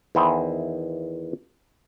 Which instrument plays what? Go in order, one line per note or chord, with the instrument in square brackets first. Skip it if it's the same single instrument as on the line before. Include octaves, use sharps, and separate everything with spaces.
[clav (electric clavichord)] E2 D#3 E4 C5 D#5